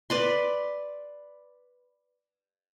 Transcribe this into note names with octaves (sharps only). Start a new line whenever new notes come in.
B4 D5 C6